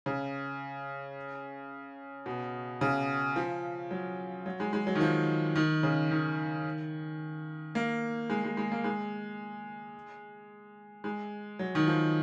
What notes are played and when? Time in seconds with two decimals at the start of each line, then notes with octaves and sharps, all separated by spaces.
0.06 C#3
2.26 B2
2.81 C#3
3.36 F3
3.91 F#3
4.46 F#3
4.60 G#3
4.73 G#3
4.87 F#3
4.95 D#3
5.01 F3
5.56 D#3
5.83 C#3
6.11 D#3
7.75 A#3
8.30 G#3
8.44 G#3
8.57 G#3
8.72 A#3
8.84 G#3
11.04 G#3
11.59 F#3
11.75 D#3
11.87 F3